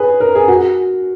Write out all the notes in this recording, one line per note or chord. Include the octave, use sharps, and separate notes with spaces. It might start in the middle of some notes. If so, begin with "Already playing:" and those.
Already playing: G#4 B4
A#4
G#4
F#4